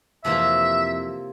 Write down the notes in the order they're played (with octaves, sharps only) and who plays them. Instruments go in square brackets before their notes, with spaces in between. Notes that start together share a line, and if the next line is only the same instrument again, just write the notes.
[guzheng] F2 C3 E3 A#3 [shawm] E5